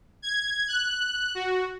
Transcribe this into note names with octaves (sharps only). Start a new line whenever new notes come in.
G#6
F#6
F#4